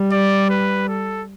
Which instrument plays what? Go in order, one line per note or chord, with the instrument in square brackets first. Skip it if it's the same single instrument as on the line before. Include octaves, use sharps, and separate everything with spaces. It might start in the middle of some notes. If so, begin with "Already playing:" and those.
Already playing: [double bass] G3
[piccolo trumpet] D5
B4
A4